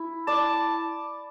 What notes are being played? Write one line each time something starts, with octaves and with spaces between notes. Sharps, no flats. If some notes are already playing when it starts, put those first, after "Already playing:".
Already playing: E4
D5 A5